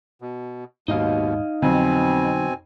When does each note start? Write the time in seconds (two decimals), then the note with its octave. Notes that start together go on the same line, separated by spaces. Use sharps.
0.21 B2
0.88 D#1 D#2 G#2 B2 D#4 D#5 F5
1.62 F2 B2 D3 F#3 C4 G#5